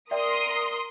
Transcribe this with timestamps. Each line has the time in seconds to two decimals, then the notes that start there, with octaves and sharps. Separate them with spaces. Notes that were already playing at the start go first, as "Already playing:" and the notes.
0.11 A#4 D5 E5 G5 C6 D#6